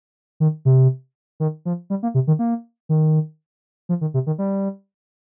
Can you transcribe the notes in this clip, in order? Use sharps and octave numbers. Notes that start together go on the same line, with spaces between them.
D#3
C3
D#3
F3
G3
A#3
C3
D#3
A#3
D#3
F3
D#3
C3
D#3
G3